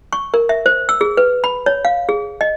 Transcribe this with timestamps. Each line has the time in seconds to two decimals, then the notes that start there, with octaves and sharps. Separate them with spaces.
0.13 C#6
0.34 A#4
0.49 E5
0.66 C5
0.89 E6
1.01 G#4
1.17 B4
1.44 B5
1.66 C#5
1.85 F5
2.09 G#4
2.41 D#5